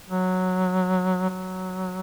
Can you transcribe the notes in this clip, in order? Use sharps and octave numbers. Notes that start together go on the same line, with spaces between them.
F#3
F#3